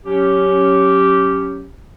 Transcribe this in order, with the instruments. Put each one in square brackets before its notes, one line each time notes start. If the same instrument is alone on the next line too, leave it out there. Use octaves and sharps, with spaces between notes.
[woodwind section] F#3 C#4 G4